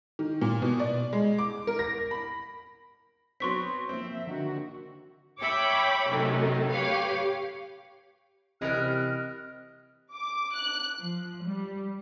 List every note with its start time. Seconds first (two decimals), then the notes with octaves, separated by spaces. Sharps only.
0.19 D#3
0.42 A#2
0.62 B2
0.80 D5
1.13 G#3
1.38 D6
1.67 A#4
1.79 A#6
2.11 B5
3.40 F#3 B3 C4 C6 C#6 B6
3.89 F3 A#3 C4 E5
4.27 D3 D#3 F#4
5.40 C#5 E5 G5 B5 D6
6.10 F#2 C3 D#3 F#3 A3
6.72 G4 B4 C#5 F5
8.61 C3 E3 G3 A#4 D#5 F6 F#6
10.14 D6
10.55 F#6
10.99 F3
11.45 G3